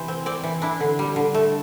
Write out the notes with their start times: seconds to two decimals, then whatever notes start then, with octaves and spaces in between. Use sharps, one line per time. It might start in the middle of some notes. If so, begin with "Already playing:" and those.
Already playing: C3 E3 C5
0.08 C4
0.26 C4 D5
0.44 E3
0.62 D4 E4
0.80 D3
0.99 G3
1.16 D3
1.34 A3